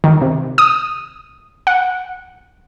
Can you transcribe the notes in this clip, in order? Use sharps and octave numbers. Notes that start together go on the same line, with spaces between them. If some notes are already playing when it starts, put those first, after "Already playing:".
D#3
C3
D#6
F#5